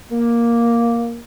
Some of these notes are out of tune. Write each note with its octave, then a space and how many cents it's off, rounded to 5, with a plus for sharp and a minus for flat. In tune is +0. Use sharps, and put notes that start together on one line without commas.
A#3 +5